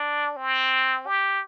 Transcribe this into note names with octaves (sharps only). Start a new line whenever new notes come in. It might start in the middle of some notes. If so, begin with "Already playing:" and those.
Already playing: D4
C4
G4